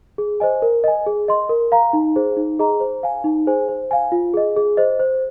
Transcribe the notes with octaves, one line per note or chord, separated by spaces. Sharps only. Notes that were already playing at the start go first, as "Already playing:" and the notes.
G#4
C5 D#5 G#5
A#4
D#5 G#5
G#4
D#5 C6
A#4
F5 A#5
D#4
G#4 C5
D#4
G#4 D#5 A#5
C5
F5 G#5
D#4
G#4 C5 G#5
C5
F5 G#5
F4
G#4 D#5
G#4
C5 D#5
C5